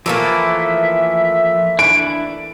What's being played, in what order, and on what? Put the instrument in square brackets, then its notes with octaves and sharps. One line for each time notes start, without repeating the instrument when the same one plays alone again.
[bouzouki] E3 A3 A#3 [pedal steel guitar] F3 A#4 [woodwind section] E5
[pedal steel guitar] D4 E4 [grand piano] D7